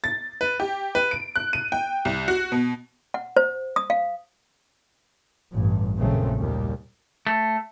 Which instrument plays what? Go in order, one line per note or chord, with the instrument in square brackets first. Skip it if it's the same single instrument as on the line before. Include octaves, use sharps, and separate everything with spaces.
[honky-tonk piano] A6
B4
G4
B4
D7
F#6
D#7
G5
C2
F#4
B2
[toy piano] F#5
C5
D#6
F5
[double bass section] A1 G2
A#1 F#2 A#2 C#3 A3 C4
D#2 A#2 G3
[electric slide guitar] A3